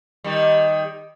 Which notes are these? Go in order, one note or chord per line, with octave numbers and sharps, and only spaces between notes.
D#3 G3